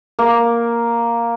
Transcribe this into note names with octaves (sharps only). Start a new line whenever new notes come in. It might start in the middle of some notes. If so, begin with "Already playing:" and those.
A#3